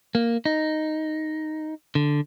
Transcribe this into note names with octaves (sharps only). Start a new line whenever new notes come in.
A#3
D#4
D3